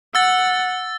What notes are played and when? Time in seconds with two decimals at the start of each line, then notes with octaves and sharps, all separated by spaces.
0.15 F#5 E6 A6